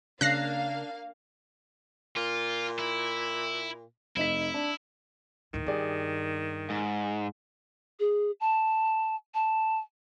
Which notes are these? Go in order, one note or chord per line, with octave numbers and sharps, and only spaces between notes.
C#3 A#3 D4 F5 F#6 A#6 C7
A#2 F4
E4
F1 D#4 E4 B6
D4
D2 A2 D#3
G2 G4 G#4 D5
G#2
G#4
A5
A5